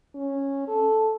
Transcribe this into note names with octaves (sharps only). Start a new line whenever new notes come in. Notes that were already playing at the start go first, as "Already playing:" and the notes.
C#4
A4